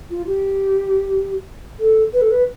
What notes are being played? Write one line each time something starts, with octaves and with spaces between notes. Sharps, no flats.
F4
G4
A4
B4
A4
B4